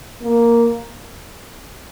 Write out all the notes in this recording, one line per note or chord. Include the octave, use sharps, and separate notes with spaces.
A#3